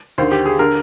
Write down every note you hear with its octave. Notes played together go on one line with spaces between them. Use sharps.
D#2 D3 C5
G4
G#4
D3 A#4